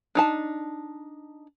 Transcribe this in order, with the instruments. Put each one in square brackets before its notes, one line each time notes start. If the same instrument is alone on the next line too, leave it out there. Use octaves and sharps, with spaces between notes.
[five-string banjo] D4 D#4 A5